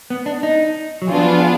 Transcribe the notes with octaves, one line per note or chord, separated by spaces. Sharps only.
B3
D4
D#4
F#3
F3 B3 D4 F4 G#4